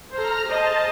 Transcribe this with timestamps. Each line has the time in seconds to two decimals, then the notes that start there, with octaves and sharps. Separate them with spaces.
0.13 A4 C5 A#5 F6 A#6
0.45 G#4 C5 D#5 A5